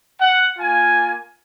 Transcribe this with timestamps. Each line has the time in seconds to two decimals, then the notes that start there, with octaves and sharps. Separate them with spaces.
0.19 F#5
0.58 A#3 F4 G#5